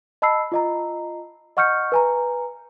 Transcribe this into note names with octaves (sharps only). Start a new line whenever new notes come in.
D#5 A5 B5 E6 C7
F4 D#5 A#5
D#5 F#5 C#6 F6 G6 C#7
B4 G#5 A#5